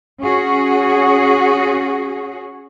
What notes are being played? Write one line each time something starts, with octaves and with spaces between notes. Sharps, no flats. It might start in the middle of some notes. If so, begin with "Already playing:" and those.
C#4 F#4 G#4